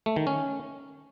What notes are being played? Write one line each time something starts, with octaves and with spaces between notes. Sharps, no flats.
A3
D#3
C#4